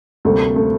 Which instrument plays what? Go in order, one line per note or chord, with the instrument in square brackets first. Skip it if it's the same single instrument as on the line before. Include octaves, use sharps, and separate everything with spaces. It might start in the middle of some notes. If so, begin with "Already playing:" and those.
[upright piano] D2 C3 G3 A#3 [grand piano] A3
[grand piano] A3